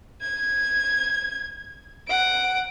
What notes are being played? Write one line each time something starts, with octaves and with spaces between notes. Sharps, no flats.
G#6
F#5 D7